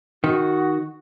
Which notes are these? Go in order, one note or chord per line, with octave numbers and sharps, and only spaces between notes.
D#3 F#4